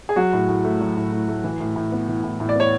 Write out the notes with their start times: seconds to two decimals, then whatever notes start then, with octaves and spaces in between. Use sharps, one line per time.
0.09 G#4
0.16 F#3 F#4
0.33 A2
0.48 A2
0.65 A3
0.81 F#3
0.97 A2
1.12 A2
1.28 A3
1.44 E3
1.60 A2
1.76 A2
1.92 B3
2.08 E3
2.24 A2
2.40 A2
2.49 D5
2.56 B3 C#5